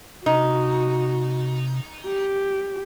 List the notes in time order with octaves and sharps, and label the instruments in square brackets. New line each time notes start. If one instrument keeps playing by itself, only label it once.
[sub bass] C3 [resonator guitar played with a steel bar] D#4 [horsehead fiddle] F#4
[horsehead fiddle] G4